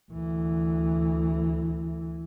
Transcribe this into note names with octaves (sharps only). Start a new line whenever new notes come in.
D2 E3